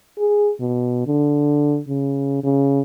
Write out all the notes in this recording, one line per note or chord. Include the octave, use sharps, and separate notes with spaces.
G#4
B2
D3
C#3
C#3